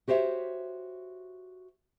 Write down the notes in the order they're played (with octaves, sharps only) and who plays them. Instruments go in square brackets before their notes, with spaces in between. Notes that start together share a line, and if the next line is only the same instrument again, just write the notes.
[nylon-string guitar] F#4 G4 C5 C#5 E5